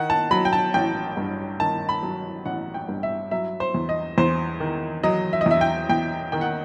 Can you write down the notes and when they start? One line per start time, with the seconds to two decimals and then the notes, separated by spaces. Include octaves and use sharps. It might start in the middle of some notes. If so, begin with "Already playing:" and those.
Already playing: D#3 F#5
0.10 A5
0.31 F#3 B5
0.45 G5
0.53 A5
0.74 A1 G5
1.17 G2
1.60 D#3 A5
1.89 B5
2.03 F#3
2.45 A1 F#5
2.74 G5
2.88 G2
3.03 E5
3.31 F#3 E5
3.60 C5
3.74 E2
3.89 D#5
4.18 E2 C5
4.60 D#3
5.03 F#3 D#5
5.33 E5
5.41 D#5
5.46 E2 E5
5.61 G5
5.89 E2 G5
6.32 D#3 G5
6.41 F#5